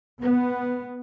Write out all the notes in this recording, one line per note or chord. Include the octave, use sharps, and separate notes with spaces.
B3